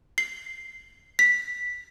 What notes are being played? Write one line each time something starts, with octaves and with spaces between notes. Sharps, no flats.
C7
B6